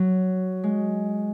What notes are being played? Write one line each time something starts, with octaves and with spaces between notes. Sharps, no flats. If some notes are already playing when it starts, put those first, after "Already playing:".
Already playing: F#3
G#3